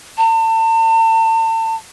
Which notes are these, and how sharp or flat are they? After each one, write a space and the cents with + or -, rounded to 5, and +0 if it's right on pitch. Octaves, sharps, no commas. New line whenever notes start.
A5 +35